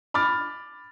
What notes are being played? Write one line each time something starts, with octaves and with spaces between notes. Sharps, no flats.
B5 D6 F6 A6